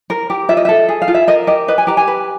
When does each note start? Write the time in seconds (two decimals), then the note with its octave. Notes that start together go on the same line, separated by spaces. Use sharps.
0.10 A#4
0.30 G4
0.49 F4 E5
0.57 D#5
0.65 A4 E5
0.89 G#4
1.02 F5
1.08 F4
1.14 E5
1.28 A#4 D#5
1.47 G4 D#5
1.68 B4 D#5
1.78 G#5
1.87 G4 A#5
1.97 G#5
2.07 B4